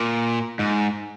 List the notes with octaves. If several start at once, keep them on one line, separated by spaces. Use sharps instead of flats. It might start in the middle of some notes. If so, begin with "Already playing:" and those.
Already playing: A#2
G#2